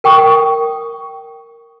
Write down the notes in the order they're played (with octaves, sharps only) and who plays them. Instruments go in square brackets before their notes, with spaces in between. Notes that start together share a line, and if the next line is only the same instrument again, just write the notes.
[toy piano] A#4 G5 C#6 D#6